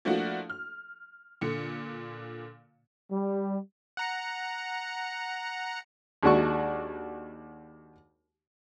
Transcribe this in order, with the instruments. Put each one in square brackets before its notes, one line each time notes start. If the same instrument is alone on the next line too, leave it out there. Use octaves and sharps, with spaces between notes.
[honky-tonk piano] F3 A3 A#3 D4 E4 F#4
F6
A#2 D3 C#7
[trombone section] G3
[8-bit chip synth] F#5 A#5 C#7
[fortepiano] D#2 G#3 D4 F#4 C#6